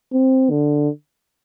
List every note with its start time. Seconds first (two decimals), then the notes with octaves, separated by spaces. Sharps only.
0.13 C4
0.50 D3